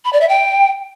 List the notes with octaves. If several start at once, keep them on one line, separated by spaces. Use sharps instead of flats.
B5
D5
E5
G5